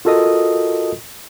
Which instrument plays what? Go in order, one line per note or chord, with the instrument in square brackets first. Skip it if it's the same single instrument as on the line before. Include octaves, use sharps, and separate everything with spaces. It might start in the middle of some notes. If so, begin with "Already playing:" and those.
[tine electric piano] F4 F#4 A4 A#4 D#5 D#6